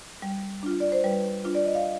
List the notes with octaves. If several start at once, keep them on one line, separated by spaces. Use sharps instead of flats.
G3
D4 F4
D5
C5
G3 B4
D4 F4
D5
D#5
F5